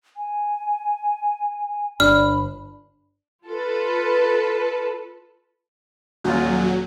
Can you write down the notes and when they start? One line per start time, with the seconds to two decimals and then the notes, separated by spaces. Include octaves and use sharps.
0.17 G#5
2.00 G1 D4 B5 F6
3.48 F4 A4 B4
6.24 D#1 F#3 F4